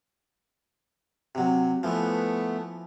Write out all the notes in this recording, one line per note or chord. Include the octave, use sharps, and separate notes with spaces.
C3 F#3
E3 F3 A3 B3